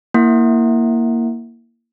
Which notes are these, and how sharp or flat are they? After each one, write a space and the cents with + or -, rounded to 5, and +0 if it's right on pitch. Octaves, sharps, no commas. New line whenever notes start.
A#3 +0 E4 +0 F#5 -15